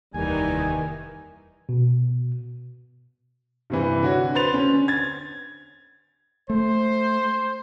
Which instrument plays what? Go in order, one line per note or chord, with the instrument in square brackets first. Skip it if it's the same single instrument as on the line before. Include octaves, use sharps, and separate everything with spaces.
[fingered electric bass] F1 D#2 [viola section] D#3 E3 D#4 [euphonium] G3 [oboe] G#5
[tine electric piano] B2
[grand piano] G2 C3 E3
D3 F#4 C#5
B4 C5 C6 A6 F7
D3 C#4
G#6 A6
[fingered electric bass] A3 [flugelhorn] C5